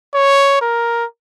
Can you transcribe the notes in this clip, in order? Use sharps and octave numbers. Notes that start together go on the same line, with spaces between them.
C#5
A#4